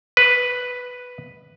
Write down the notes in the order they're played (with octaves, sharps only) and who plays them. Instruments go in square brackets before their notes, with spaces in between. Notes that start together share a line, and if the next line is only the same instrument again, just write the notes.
[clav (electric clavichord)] B4